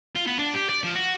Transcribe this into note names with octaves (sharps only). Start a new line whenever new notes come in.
F4
B3
D4
G4
D5
F3
F#4